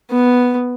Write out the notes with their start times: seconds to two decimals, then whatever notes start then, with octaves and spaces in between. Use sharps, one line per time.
0.10 B3